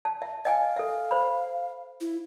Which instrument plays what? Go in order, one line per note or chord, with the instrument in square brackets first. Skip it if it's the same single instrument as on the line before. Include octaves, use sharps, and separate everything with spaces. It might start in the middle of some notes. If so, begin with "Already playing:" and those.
[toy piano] A5
E5
[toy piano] D#5 G5 G#5 [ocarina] F5
[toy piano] A4 E5
C5 B5
[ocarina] E4